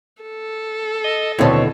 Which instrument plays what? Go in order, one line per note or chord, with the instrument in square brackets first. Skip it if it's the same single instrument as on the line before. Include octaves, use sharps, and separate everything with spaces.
[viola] A4
[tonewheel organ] D#5
[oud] D#2 B2 [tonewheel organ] D3 E4 [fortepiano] C4 C#5 A5